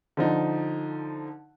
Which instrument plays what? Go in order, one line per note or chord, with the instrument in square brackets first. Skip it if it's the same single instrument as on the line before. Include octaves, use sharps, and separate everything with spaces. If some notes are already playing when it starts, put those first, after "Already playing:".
[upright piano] D3 F3 D#4